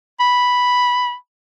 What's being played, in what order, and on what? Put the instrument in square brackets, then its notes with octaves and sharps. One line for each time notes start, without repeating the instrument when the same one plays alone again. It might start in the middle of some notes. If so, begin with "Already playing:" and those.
[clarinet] B5